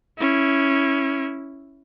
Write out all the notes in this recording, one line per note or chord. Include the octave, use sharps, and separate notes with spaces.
C#4 E4